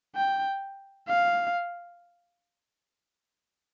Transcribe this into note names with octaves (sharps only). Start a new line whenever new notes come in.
G5
F5